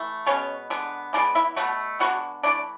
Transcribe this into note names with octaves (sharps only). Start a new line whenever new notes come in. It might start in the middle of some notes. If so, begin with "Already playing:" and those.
Already playing: E3 A3
B2 G#3 B3 C#4 C#5
D3 G#3 B3
E3 G#3 B3 D4 D5
E4 E5
B2 F#3 A3 F#4 F#5
D3 G#3 B3 F#4 F#5
E3 A3 D4 D5